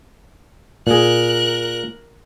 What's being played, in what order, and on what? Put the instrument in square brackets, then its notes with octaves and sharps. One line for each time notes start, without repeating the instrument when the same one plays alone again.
[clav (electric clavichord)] A#2 G#4 [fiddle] A#4 F#6